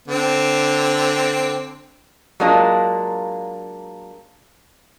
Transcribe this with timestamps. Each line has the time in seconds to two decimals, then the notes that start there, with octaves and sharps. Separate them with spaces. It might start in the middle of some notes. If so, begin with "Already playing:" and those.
0.08 D3 C4
2.40 F#3 G#3 A#3 D4 F4